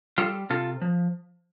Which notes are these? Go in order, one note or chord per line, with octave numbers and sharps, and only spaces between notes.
G3 F4 A4
C3 F4 A4
F3